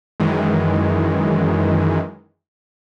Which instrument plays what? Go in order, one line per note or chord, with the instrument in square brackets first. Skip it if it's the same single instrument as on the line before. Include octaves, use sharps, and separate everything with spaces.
[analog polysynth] F#2 D#3 E3 G#3